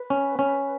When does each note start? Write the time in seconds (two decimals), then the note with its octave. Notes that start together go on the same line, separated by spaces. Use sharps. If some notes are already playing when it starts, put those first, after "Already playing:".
Already playing: B4
0.10 C#4
0.39 C#4